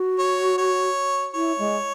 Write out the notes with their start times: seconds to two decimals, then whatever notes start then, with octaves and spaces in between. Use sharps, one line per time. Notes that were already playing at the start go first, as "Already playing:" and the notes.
Already playing: F#4
0.19 C#5
0.58 C#5
1.34 E4 C#5
1.59 G#3